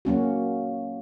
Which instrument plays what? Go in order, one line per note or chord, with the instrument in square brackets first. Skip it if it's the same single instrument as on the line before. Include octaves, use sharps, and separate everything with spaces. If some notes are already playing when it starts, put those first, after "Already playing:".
[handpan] F#3 A#3 C#4 F#4